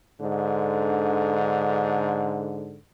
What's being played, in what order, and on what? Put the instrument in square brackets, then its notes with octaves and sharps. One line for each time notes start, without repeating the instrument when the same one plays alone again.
[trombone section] G#2 D3